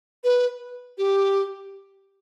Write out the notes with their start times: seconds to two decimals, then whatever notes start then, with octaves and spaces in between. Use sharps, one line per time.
0.24 B4
0.98 G4